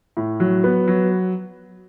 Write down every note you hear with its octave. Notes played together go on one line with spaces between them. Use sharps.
A2
F#3
B3
F#3